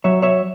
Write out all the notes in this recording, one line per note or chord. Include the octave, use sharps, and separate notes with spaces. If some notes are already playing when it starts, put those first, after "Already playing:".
F#3 C#5 E5
C#5 E5